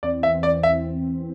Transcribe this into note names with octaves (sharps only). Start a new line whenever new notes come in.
E2 E3 C4 D5
E5
D5
E5